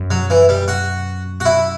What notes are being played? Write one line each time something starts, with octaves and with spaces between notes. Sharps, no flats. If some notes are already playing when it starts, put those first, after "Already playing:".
Already playing: F#2
F#3
E3
G3
F#4
F#4
E4